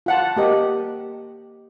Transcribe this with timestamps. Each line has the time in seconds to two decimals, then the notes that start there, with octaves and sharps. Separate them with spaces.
0.06 F4 F#5 A5
0.36 A#3 G4 D#5